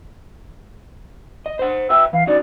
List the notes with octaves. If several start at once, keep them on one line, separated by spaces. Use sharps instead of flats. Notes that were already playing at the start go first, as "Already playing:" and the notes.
D#5
C5 F#5
B4 E5 G5 E6
E3 F5
C#4 D#4 F#4 D5